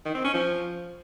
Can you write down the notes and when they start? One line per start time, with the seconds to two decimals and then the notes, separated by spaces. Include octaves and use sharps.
0.05 D#3
0.15 C4
0.24 C#4
0.34 F3